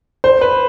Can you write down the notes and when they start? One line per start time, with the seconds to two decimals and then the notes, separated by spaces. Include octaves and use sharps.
0.24 C5
0.41 B4